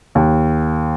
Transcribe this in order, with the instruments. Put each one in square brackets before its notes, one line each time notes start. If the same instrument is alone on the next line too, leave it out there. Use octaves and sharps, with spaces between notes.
[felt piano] D#2